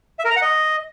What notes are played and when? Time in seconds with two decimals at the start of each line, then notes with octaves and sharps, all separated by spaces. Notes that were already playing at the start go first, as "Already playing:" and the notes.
0.19 E5
0.25 A#4
0.30 A#5
0.36 F#5
0.42 D#5